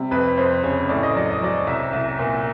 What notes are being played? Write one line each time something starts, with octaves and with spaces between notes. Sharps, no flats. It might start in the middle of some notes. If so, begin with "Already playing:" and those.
Already playing: C3 G3
F2 B4
F2 C5
C#3 C#5
A2 D5
D#5
F#3 D5
D#5
F#3 D5
C2 E5
C2
A#2